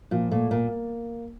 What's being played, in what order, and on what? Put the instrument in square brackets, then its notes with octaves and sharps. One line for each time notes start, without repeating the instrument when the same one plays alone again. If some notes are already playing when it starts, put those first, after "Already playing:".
[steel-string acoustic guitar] A#2 [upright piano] F3
[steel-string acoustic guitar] A#2 [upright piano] A3
[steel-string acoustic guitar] A#2 [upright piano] A#3